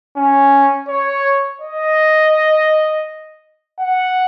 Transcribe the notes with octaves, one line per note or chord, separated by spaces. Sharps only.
C#4
C#5
D#5
F#5